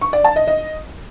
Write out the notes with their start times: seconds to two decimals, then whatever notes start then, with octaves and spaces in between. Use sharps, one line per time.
0.01 C#6
0.13 D5
0.24 A5
0.36 D#5
0.47 D#5